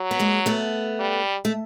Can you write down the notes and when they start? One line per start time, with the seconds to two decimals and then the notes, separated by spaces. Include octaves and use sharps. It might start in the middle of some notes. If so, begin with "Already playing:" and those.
Already playing: F#3
0.11 B3
0.19 G#3 A#3
0.46 A3 B3
1.00 G3
1.45 A3